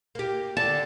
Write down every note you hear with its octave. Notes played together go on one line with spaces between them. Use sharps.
A#3 G4
D3 A5